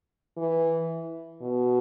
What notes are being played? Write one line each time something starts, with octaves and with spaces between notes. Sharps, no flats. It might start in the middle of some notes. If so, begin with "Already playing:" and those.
E3
B2